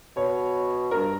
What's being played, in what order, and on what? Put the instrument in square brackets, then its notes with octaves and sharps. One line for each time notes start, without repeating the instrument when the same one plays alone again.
[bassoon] B2 [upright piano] C#5
[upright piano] G2 A#4